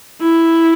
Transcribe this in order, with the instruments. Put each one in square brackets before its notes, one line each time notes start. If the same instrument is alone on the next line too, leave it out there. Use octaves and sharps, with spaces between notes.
[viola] E4